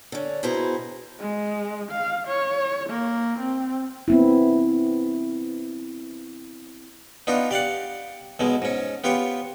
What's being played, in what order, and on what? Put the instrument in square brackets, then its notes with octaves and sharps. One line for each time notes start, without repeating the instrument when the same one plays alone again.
[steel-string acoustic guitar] D3 C#4
B2 B3 E4 G#4 C5 A#5
[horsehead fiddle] G#3
F5
C#5
A#3
C4
[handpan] B3 C4 E4
[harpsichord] B3 D4 D#4 F4
G4 D5 F5 F#5
B1 B2 G#3
G#2 C#4
B3 F4 G4 C#5